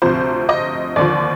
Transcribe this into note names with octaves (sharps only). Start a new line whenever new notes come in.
D2 C3 F3 C5
D#5
D#2 D3 F3 D5